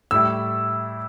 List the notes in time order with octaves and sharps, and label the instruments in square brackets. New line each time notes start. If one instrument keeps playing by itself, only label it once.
[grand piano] A2 G3 E4 E6